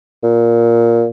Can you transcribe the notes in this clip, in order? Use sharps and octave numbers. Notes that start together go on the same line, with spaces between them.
A#2